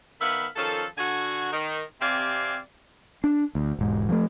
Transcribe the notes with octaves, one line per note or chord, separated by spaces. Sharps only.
D#3 B3 E5 F5 B5
D#3 F3 C#4 A4
D3 F#4 G#5
D#3
C3 C4 G4 D5 F5 G#5
D4
D2
E1 G#2
F3 G#3 A3